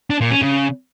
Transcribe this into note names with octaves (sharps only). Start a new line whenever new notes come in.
D4
A#2
C#4
C#3